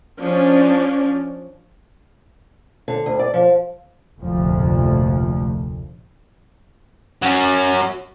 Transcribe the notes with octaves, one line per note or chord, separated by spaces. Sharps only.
F3 C#4 D4
D3
D2
D5
F3
F1 D2 A#2 F3
F#3 C#4